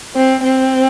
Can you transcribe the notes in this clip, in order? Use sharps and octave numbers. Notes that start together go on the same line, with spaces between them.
C4
C4